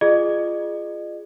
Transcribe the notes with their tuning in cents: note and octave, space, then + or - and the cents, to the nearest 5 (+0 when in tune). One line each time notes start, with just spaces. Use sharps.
F4 -15 G#4 +0 D#5 -40